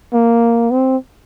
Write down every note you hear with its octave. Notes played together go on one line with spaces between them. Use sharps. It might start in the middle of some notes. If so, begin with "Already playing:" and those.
A#3
C4